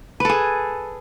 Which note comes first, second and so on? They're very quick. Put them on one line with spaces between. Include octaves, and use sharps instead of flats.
B4 A4 G#4